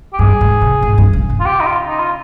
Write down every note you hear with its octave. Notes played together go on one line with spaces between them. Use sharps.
G4
G2 G#4
G#2
C3
G#2
G2
C#3
C#3
F4
G4
D#4
F4
D#4
F4